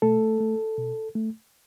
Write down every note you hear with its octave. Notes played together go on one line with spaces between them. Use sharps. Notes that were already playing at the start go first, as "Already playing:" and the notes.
B2 A3 A4
A3
B2
A3